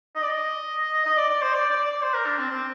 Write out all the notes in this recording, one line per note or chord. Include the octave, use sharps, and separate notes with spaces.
D#5
D5
D#5
D#5
D5
D5
C5
D5
D5
D5
C5
A#4
D4
C4
C4